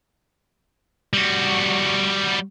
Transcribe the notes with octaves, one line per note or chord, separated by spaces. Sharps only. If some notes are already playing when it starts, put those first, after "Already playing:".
G3 F#4